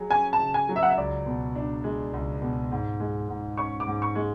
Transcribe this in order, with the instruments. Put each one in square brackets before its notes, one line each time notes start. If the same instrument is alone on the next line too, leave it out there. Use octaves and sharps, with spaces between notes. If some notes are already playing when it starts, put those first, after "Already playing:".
Already playing: [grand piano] F#3 G#4
[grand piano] C#4 [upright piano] G#5
[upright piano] A5
[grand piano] C#3
[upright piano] G#5
[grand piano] F#3
[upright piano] E5
F#5
E5
[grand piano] C#2 [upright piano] D5
[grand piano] B2
D4
G#3
C#2
B2
G#2
G#3
G#2
[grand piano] C#4 [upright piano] C#6
[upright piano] D6
[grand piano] G#2
[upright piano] C#6
[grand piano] G#3